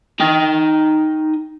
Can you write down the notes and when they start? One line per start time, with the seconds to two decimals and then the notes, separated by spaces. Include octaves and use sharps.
0.20 D#4 G5